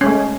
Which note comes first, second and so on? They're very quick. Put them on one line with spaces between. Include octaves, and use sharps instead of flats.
C#4 G#3 A3